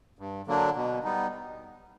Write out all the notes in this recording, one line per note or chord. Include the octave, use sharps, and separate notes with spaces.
G2
D3 F#3 A#3 D4
B2
G3 B3 D#4